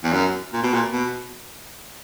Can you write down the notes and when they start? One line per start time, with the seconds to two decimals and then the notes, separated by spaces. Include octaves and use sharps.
0.03 E2
0.12 F#2
0.53 A#2
0.63 B2
0.74 A#2
0.93 B2